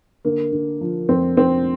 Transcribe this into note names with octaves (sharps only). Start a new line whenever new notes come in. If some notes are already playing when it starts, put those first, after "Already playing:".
D3 A#3
D3
F3
F2 C4
F2 C4